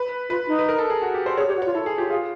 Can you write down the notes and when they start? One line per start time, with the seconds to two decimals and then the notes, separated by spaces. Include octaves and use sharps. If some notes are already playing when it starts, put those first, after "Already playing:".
Already playing: B4
0.29 F4 B4
0.48 D#4
0.59 B4
0.69 A#4
0.78 A4
0.90 G#4
1.02 F#4
1.14 G4
1.26 C5
1.37 G#4 C#5
1.48 G4
1.51 C#5
1.56 F#4
1.62 F4 C#5
1.74 E4 A4
1.86 G#4
1.98 F4 G4
2.10 F4 G#4